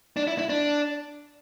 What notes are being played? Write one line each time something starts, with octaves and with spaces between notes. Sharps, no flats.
D4
E4
E4
D4